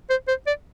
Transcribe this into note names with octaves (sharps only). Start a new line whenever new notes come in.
C5
C5
D5